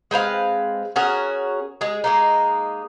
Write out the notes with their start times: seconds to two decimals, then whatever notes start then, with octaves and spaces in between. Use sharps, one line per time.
0.11 G#3 C4 B4 F5
0.96 C#4 F#4 G#4 A#4
1.81 G#3 G#4
2.04 G#3 A#3 D#4